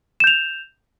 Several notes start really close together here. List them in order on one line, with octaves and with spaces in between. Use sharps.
E7 G6 F7